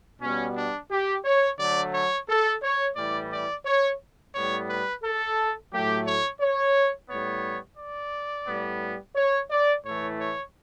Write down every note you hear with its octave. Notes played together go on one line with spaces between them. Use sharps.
B2 G3 B3 C#4
D4
G4
C#5
D3 F#3 A3 D5
C#5
A4
C#5
A2 E3 G3 D5
D5
C#5
A2 G3 B3 C#5
B4
A4
A2 F#3 A3 G4
C#5
C#5
A2 G3 B3 C#5
D5
A2 G3 B3
C#5
D5
A2 E3 A3 C#5
C#5